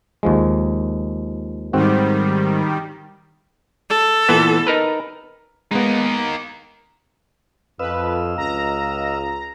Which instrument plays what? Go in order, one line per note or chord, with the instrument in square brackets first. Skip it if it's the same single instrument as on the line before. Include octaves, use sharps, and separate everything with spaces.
[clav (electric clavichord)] D#2 F3 G#3
[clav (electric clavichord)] G#2 C4 F#4 [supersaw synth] D#3 G3
[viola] A4
[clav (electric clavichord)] A#2 E3 B3
D#4 A#4 B4
[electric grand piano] G#3 B3 [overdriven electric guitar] A#3 D#4
[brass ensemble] F2 [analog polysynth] B4 [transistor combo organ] D#5 F5 E6
[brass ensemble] C#2 [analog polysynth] A#5